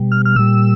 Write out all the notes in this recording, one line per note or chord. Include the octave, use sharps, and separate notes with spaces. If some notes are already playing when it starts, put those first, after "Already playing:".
Already playing: B2 G3
F6
F6
A#2 G3 E6